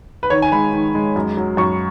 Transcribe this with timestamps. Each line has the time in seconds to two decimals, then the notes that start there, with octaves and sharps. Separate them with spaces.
0.23 B4
0.30 D#3 C#5
0.42 G#5
0.52 G#3 B5
0.73 D#3
0.95 G#3
1.16 F#2
1.37 F#3
1.57 F#2 C#6